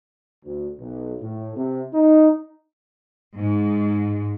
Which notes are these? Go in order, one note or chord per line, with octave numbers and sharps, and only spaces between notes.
D2
B1
A2
C3
D#4
G#2